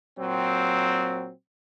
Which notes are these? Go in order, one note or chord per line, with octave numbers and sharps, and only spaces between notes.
A#2 F#3 C4